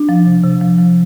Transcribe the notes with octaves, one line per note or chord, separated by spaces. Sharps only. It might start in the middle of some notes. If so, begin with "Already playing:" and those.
Already playing: D4
F3
C3
C3
F3
F3